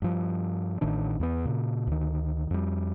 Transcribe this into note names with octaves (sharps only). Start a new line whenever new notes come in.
G2 F3
A1 A2 D#3 D4
E2 A#3 B3
A#2 C#3
D2 D#3
F2 G3